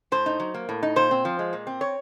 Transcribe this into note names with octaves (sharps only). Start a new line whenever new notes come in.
A2 C5
D#4
F#3
A#3
A2
D#4
A#2 C5
C4
F3
G#3
A#2
C4
C#5